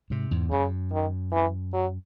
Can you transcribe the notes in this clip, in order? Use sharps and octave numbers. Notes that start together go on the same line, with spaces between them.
G#2 C3
E2 G#2
F#2 C#3
D#3
E3
F#3